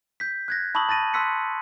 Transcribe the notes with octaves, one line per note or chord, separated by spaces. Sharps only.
G6 B6
F#6 G#6 A#6
A5 B5 C#6 D#6 E6 F#7
A5 A6 A#6 D#7
A5 C6 E6 F#6 B6 C#7